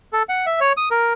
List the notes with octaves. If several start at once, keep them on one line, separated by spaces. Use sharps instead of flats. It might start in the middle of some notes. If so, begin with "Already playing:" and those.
A4
F#5
E5
C#5
D#6
A#4